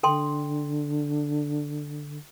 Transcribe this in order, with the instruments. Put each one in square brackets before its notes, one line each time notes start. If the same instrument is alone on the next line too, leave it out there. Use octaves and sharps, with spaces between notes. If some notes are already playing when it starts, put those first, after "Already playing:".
[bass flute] D3 [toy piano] A4 G5 C6